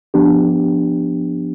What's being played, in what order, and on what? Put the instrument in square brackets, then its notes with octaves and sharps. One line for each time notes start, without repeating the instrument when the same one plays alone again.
[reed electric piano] F3 B3 D4 G4